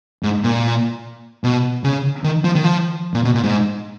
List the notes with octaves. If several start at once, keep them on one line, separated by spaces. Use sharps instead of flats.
G#2
A#2
B2
C#3
D#3
F3
D#3
F3
A#2
B2
A#2
G#2